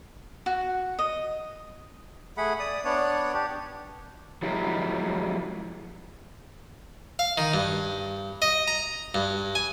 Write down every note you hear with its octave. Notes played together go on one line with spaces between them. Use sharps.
F#4
D#5
A3 G#4 F#5 B5
D5 D#6
B3 D4 C#5 D5
D4 G4
F3 F#3 G#3 E4 G4 A#4
F5
D#3
G2
D#5
A#5
G2
G#5